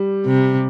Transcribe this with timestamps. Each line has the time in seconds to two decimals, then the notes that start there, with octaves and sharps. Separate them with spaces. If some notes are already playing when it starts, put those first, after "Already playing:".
Already playing: G3
0.26 C3